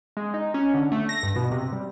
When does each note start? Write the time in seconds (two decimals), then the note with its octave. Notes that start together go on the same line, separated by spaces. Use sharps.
0.17 G#3
0.34 D#4
0.54 C#4
0.74 D3
0.92 A3
1.09 A#6
1.23 G2
1.36 B2
1.52 C3
1.72 G3